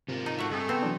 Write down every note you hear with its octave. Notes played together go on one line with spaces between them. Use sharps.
G#2 C3 F4 A#4
D#4
A2 A3 F#4 E5 F#5
G2 C3 A3 G#4 A4
B3 C4 E6
E3 F#3 D4